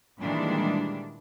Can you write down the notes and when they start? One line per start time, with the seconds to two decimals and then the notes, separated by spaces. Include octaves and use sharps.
0.20 A#2 D#3 E3 G3 G#3 D4